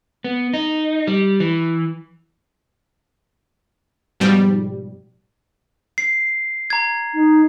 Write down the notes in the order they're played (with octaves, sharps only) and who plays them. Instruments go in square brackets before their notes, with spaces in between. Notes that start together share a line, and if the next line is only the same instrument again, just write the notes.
[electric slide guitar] B3
D#4
G3
E3
[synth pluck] G#2 B2 F3 G3
[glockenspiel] C7
A#5 G#6
[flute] D#4